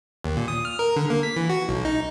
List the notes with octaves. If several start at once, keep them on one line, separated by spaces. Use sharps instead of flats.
D#2
A#2
D#6
F6
A#4
D3
A#3
B6
E3
F#4
B1
D#4